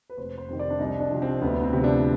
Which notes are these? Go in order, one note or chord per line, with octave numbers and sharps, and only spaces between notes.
B4
F1 C5
C5
F2 C3 D#3
D5
D4
C2 D#4
D4
C3 F3
C4
D2 B3
C4
C3 F3
D4